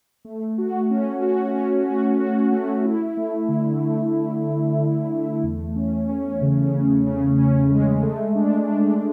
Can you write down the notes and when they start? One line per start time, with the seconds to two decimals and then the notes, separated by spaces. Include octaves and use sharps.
0.25 A3
0.58 F#4
0.91 C#4
1.22 F#4
1.55 C#4
1.87 F#4
2.20 F#4
2.52 A3
2.85 E4
3.17 A3
3.49 D3
3.82 A3
4.15 A3
4.47 A3
4.79 D3
5.11 A3
5.43 E2
5.76 C#4
6.09 C#4
6.41 C#3
6.74 C#3
7.07 C#3
7.38 C#4
7.71 G#3
8.03 A3
8.35 D4
8.68 D4